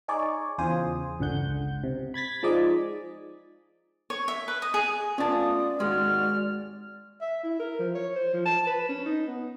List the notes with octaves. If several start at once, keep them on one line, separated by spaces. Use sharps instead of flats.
D#4 G#4 C#5 D5
E2 C#3 F4 G#4 C5 D#6
G1 C#2 D3 F#5 G6
C3
B5 G#6 A6 B6
F3 G#3 D#4 D5 D#5
C#5
E5
B4
D#5
G#4
A3 B3 C#4 F4 D5 A5 D#6
G#1 D#2 G#3 F#4 F6
E5
E4
A#4
F3
C#5
C5
F3
A5
B4
C#4
D#4
B3